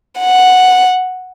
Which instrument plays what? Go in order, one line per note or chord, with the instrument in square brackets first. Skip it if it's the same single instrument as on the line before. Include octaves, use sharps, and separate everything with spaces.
[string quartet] F#5